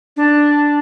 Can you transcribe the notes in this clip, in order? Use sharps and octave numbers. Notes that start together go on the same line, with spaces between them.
D4